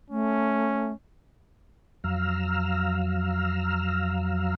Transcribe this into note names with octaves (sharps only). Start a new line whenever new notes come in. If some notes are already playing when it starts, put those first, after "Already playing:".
A3 C#4
F2 F#3 F5 A#5 E6 F6